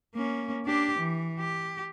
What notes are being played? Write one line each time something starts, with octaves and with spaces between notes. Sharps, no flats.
A#3 C#4
D4 G4
E3
G4